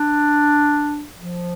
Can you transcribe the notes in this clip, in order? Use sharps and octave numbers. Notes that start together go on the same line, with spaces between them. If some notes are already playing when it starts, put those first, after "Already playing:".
Already playing: D4
F3